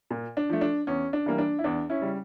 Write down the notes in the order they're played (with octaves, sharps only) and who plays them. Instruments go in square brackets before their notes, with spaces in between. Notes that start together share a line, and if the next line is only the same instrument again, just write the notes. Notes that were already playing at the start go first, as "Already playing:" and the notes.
[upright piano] A#2
D4
F3 A3
D4
E2 C#4
D4
E3 G3 A#3
D4
E4
E2 D4
C#4 E4
C#3 G3